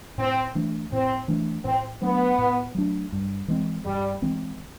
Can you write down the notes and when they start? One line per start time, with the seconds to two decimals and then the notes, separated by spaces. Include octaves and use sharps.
0.18 A2 C4
0.55 E3 A3 D4
0.92 A2 C4
1.28 E3 A3 D4
1.65 A2 C4
2.02 F#3 A3 B3 D4
2.38 A2
2.75 F#3 A3 D4
3.12 G2
3.48 E3 G#3 C4
3.85 G2 G3
4.22 E3 G#3 C4